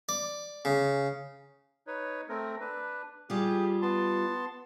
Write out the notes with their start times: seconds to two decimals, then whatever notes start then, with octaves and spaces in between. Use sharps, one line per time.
0.09 D5
0.65 C#3
1.87 D#4 B4 C#5
2.29 A3 C4 A#4
2.60 D4 B4
3.30 G3 F4 G4 G#4
3.82 B3 A5 C6